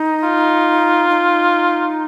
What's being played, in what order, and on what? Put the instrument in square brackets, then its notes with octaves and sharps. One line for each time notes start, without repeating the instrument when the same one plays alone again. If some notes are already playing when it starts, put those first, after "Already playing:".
Already playing: [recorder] D#4
[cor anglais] F4
[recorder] D#4